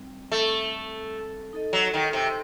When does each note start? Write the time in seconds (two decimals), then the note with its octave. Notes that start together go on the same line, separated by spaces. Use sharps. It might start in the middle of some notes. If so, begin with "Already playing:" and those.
Already playing: G3 C4 D#4
0.32 A3
1.53 D#4 A4 D#5
1.73 F#3
1.94 D#3
2.13 C3